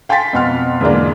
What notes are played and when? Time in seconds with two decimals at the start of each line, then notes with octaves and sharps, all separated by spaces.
0.09 F5 G5 G#5 C6 A6 B6
0.33 F2 B2 F#5 C6 F6
0.81 E2 G#2 D3 G#3 A#3 D4